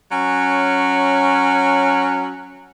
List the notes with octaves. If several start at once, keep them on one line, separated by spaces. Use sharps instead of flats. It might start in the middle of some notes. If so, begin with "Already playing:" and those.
F#3 C#4